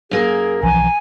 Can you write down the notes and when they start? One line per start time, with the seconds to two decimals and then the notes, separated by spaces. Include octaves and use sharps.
0.11 F#2 A#3 G#4 A#4
0.63 B1 E3 F3 G#5 A#5